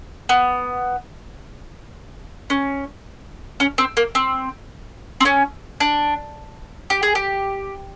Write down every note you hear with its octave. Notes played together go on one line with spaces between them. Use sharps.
B3
C#4
C#4
C4
A#3
C4
C4
C#4
D4
G4
G#4
G4